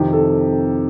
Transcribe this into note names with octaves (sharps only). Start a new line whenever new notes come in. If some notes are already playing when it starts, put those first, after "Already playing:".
Already playing: F2 C3 D#3 G4
A4